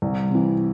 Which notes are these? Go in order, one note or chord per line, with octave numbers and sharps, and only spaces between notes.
C2
C3 E3